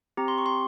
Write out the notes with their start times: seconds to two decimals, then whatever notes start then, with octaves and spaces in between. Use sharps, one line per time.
0.17 C4 G4 A#5
0.28 C6
0.38 C#6
0.46 C6